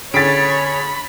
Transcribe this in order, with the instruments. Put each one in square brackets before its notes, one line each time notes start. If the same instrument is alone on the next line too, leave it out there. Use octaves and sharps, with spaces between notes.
[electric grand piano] D3 C#4 G#4 [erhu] C#5 [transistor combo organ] B5 [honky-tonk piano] A6 B6 D7